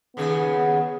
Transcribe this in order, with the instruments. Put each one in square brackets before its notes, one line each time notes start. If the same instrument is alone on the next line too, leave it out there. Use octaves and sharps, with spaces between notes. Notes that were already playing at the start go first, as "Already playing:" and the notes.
[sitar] D#2 C#3 G#4 [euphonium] B3